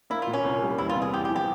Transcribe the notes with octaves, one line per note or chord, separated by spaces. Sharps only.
A#3 E4
F4
A#2
C#4
C2
G3
E2 E4
F4
C3
G#4
E2 G4
G4
F3
G4